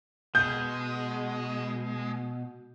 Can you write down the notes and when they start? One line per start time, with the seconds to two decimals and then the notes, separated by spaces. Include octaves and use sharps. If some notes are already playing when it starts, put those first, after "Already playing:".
0.35 B2 G#3 G6